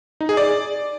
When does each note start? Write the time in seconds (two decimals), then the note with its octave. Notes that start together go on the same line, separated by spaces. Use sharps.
0.21 D#4
0.29 G#4
0.37 D5